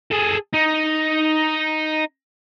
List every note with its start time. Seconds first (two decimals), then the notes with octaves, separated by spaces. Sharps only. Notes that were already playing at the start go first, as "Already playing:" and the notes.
0.12 G#4 A4
0.53 D#4